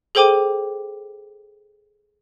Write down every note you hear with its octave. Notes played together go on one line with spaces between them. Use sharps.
G#4 A4 C5 G5 D6 D#7